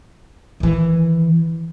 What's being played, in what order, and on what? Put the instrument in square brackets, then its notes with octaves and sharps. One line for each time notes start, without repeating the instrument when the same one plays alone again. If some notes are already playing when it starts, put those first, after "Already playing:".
[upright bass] D#3 E3